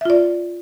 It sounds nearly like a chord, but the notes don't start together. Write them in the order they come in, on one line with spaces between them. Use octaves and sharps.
E5 F4 D5